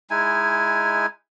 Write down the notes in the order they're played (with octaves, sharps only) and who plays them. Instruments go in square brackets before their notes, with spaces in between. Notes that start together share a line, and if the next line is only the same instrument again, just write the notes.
[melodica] G#3 D#4 E4 G#5